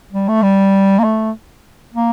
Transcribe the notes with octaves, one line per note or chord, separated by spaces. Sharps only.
G3
A3
G3
A#3
A3
A#3